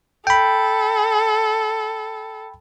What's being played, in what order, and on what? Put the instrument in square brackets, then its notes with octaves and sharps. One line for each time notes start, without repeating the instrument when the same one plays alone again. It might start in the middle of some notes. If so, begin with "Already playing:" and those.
[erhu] A4 [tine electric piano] G5 B5